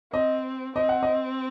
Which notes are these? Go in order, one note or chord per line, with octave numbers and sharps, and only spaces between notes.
C4 D#5
C4 D#5
F#5
D#5